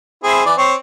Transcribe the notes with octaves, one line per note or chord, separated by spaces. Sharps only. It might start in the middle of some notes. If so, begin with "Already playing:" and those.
C4 E4 G#4
E3 D5
C4 C#5